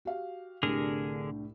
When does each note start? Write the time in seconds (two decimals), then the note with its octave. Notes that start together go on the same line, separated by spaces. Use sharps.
0.05 F#4 G4 F5
0.63 C2 A2 D3 D4 G4 G#4 A#4